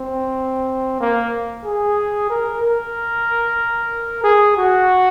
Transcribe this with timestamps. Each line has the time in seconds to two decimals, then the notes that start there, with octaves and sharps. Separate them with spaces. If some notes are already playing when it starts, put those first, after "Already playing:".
Already playing: C4
1.00 A#3
1.65 G#4
2.30 A#4
2.63 A#4
4.24 G#4
4.57 F#4